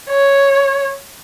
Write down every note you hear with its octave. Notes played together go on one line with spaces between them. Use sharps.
C#5